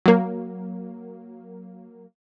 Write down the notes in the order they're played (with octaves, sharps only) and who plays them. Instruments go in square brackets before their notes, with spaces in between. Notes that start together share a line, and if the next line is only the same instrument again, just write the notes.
[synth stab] F#3 A#3